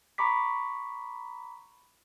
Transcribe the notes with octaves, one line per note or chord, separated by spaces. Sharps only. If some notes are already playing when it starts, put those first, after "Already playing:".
A#5 B5 C#6 D6 B6